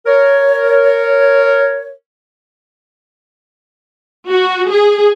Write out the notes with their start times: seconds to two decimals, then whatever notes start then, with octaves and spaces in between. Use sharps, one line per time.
0.06 A#4 C#5
4.28 F#4
4.69 G#4